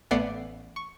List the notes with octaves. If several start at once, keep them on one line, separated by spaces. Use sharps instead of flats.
A1 A3 B3 D5 F#5 C7
C#6